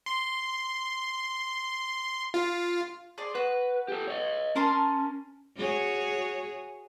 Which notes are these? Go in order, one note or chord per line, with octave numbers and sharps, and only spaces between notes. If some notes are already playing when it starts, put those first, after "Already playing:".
C6
F4
G#4 D5 C6
F#4 B4
G4 A4
C#5 D#5
C#4 A#4 A5 C6
F#4 G#4 C#5